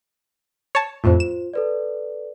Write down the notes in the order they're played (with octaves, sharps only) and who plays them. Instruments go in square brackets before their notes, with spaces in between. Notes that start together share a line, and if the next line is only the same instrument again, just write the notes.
[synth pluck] C#5 A5
[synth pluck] F2 A2 [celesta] F4 C5
[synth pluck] E7
[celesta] A4 B4 D5